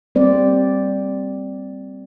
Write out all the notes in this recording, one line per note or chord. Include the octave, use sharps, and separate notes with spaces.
G3 A#3 C4 C5 D5